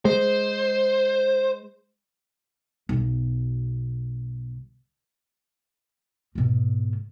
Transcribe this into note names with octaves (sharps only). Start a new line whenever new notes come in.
G#3 C5
B1 B2
G#2 B2